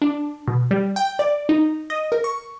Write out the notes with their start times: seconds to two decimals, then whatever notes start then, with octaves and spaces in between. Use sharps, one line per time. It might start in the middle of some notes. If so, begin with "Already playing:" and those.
0.02 D4
0.47 B2
0.71 G3
0.96 G5
1.19 D5
1.49 D#4
1.90 D#5
2.12 A#4
2.24 C#6